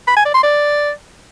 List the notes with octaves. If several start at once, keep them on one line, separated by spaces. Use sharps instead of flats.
B5
G#5
D5
C6
D5